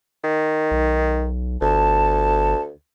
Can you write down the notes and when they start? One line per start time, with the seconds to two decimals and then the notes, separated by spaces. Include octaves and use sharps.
0.24 D#3
0.71 B1
1.61 G1 D2 A5